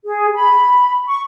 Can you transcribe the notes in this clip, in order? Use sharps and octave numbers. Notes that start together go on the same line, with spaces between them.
G#4
B5
C#6